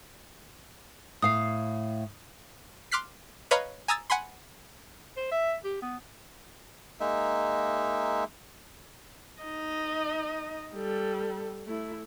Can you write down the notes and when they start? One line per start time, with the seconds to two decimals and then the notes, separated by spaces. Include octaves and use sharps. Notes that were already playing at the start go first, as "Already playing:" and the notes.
1.22 A2 F5 D#6 C7
2.91 C6 D6 F6 F#6 B6 C7
3.51 B4 C#5 D#5 F5 A#5 B5
3.88 G#5 A#5 D#6 E6 G#6 A6
4.10 F#5 G#5 B5 C6
5.17 C5
5.32 E5
5.65 G4
5.82 B3
7.00 G#3 A#3 D#4 E5
9.42 D#4 D#5
10.73 G3 A4
11.66 A3 E4